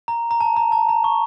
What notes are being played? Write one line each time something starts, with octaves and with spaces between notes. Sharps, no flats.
A#5
A#5
A5
A#5
A5
A#5
C#6